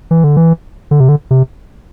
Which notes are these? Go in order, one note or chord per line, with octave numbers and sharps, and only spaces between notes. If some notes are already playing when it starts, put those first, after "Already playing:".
E3
D3
E3
D3
C3
D3
C3